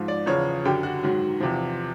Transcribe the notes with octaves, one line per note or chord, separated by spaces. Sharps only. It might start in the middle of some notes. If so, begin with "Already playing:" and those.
Already playing: G#2 F3
D5
E2 C#3 F3 C#5
F#2 D3 F#3 G4
F#4
G#2 D#3 F#3
E2 C3 F3